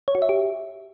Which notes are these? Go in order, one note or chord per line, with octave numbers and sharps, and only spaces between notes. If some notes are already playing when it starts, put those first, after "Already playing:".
C#5
F#4
E5
G4